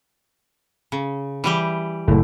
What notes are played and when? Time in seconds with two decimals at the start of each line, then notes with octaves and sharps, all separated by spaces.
0.92 C#3
1.44 E3 G3 G4
2.08 F#1 A2 A3